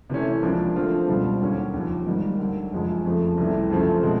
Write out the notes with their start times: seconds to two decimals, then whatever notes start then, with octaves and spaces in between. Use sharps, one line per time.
0.10 C3 E3 A3 C#4
0.42 C#2 C#3 F3 A#3 D4
0.76 D3 F3 A3 C4 F4
1.08 C#2 B2 G3 C4 F4
1.41 D#2 D3 F#3 A#3 C#4
1.74 D#2 C#3 F3
2.06 G#2 D#3 G3 A#3
2.39 D2 D3 F#3
2.72 F#2 C#3 F3 G#3
3.05 F2 C#3 F3 A3
3.37 C2 C3 E3 A3
3.70 F#2 C#3 F3 A3 C4
4.03 B2 G#3 C4